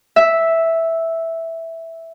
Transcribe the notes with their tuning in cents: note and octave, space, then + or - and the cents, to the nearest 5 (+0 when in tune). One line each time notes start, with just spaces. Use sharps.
E5 -5